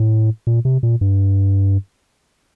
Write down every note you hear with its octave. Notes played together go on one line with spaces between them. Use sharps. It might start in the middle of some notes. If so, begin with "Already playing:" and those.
Already playing: A2
A#2
C3
A#2
G2